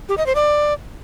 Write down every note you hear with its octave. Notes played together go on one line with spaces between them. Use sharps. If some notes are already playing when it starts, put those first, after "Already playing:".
G4
D#5
C5
D5